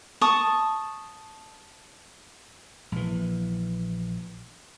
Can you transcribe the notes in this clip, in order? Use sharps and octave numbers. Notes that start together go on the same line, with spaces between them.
A5 C#6 D#6
A#1 E3